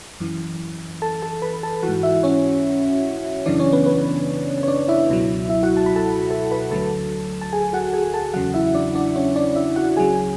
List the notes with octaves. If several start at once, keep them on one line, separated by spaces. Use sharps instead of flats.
F#2 E3
A4 A5
A4 A5
B4 B5
A4 A5
E3 F#4 F#5
G#2
E4 E5
C#4 C#5
F#2 C#3 E3 D4 D5
C#4 C#5
B3 B4
B3 B4
C#5
D4 D5
E4 E5
C#2 B2 F#3
E4 E5
F#4 F#5
A5
B5
A4 A5
A4 A5
B4 B5
D2 D3 F#3 A4 A5
A5
G#4 G#5
F#4 F#5
G#4 G#5
A4 A5
E2 C#3 F#3 F#4 F#5
E4 E5
D4 D5
D4 D5
C#4 C#5
D4 D5
E4 E5
F#4 F#5
C#2 C#3 F#3 G#4 G#5